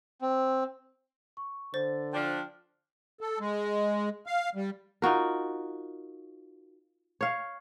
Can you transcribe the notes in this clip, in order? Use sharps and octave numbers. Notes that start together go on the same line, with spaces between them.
C4
C#6
D3 C5 A6
F3 D4 G5 F6
A4
G#3
F5
G3
D#4 F4 F#4 A#4
C#5 F5